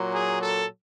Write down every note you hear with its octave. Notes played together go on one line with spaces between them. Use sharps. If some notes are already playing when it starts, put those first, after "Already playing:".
Already playing: A#2 F#3
G#4
A4